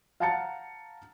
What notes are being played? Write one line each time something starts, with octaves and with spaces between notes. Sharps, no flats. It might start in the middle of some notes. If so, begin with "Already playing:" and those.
F5 F#5 A5 A#5 A6 C#7